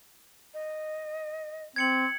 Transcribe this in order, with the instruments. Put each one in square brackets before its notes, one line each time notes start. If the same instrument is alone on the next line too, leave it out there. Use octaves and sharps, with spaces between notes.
[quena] D#5
[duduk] C4 [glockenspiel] G#6 C#7 F#7